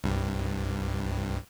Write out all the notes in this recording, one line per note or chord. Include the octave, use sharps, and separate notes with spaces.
C2 G2